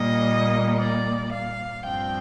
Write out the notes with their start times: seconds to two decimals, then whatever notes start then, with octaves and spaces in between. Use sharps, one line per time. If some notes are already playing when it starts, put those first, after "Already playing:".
Already playing: A#2 G3 A#3 D#5
0.79 D5
1.32 F5
1.86 G2 F3 C4 G5